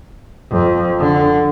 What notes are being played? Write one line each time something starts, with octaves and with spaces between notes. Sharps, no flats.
F2
D3